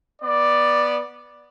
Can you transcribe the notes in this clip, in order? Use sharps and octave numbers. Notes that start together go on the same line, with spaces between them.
B3 D5